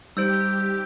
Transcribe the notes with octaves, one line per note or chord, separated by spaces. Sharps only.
G3 D#4 G4 C5 E6 G6 D7